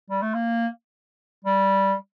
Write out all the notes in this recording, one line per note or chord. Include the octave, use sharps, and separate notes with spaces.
G3
A3
A#3
G3